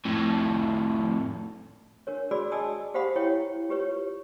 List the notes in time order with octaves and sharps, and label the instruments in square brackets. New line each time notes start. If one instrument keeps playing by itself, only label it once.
[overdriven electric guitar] F2 A2
[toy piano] D4 A#4 C#5
F#4 G#4 D5 B5 D6 E6
D5 D#5 G#5 A5 D#6 E6
G4 C5 F5 F#5 B5 D#6
E4 C#5 G5
F4 G4 B4 C#5